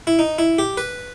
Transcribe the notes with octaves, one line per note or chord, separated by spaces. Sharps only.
E4
D#4
E4
G4
B4